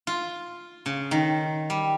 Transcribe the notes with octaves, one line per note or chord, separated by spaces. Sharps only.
F4
C#3
D#3
G3